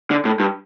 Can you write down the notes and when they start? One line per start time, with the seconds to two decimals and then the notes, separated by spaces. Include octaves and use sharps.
0.11 D3
0.25 A2
0.40 G2